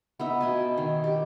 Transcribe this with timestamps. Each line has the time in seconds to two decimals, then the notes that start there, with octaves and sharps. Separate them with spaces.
0.19 B3 D#4 E5
0.41 B2 G#5 A5
0.77 D#3
1.04 G4